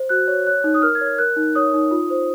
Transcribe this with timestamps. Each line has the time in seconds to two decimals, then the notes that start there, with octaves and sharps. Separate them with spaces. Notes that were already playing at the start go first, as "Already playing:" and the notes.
Already playing: C5
0.09 F#4 F#6
0.28 C#5
0.47 C#5 F#6
0.64 D#4
0.74 D#6
0.82 A#4 F6
0.95 G#6
1.01 C#5
1.06 G#6
1.18 A#4 F#6
1.36 D#4
1.55 C#5 D#6
1.74 D#4
1.91 F4
2.10 C5